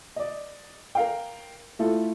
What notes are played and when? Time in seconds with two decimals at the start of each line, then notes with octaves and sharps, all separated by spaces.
0.16 D5 D#5
0.95 A#4 F5 G5
1.79 A3 E4 F4 A4